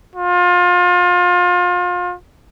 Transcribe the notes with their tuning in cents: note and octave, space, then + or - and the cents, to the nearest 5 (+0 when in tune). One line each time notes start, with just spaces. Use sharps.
F4 +30